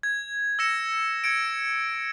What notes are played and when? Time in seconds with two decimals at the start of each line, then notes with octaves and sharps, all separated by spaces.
0.03 G#6
0.59 E6 G#6 A#6 C#7 E7
1.24 G#6 C#7 D7